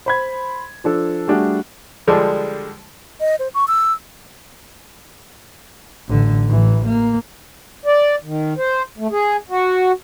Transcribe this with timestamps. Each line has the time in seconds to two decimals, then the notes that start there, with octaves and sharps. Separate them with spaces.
0.06 C5 B5 G#6
0.84 F3 D4 A4
1.28 G3 A3 D4 F#4 G#4
2.07 D3 F3 G3 G#3 D4
3.20 D#5
3.39 C5
3.54 C#6
3.68 E6
6.08 A1 D3
6.48 A1 E3
6.85 A#3
7.86 D5
8.24 D#3
8.58 C5
8.98 A3
9.11 G#4
9.50 F#4